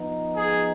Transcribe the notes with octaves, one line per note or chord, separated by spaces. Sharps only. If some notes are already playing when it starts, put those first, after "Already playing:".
Already playing: F3 B3 D#4
G#4